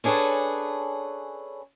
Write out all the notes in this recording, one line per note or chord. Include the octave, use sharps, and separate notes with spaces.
C#4 D4 G#4 A4 B4 C#5